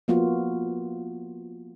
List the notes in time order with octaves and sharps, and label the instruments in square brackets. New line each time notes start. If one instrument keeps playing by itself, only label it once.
[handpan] F3 A#3 B3 F4 F#4